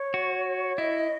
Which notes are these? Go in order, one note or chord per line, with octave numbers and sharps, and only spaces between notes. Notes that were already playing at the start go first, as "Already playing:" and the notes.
Already playing: C#5
F#4
E4 D#5